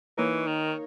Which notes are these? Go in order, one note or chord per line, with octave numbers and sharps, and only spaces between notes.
E3 A#3 D#4 A#4 C#5
D#3